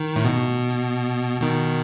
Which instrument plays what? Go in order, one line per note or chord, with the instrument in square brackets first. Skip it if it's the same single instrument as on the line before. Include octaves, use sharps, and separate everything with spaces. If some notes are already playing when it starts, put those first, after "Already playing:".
Already playing: [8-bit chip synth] D#3
A2
B2
B2 D#3